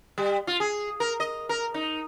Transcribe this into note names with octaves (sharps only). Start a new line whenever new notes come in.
G3
F4
G#4
A#4
D#5
A#4
D#4